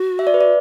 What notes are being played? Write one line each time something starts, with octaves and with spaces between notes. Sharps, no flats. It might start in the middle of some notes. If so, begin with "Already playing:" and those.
Already playing: F#4
E5
D5
B4
D5